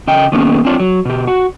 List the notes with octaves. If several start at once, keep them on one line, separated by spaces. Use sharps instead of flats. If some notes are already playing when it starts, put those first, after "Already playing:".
C#3 D#5 G5
D#3 A#3 B3 C#4 G#4
C4 D4 F4 C#5
F#3
B2 G4
F#4